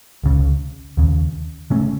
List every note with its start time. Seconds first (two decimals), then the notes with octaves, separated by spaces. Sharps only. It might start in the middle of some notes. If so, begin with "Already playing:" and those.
0.23 C#2 C#3
0.97 D#2 C#3
1.70 C#3 A3 C#4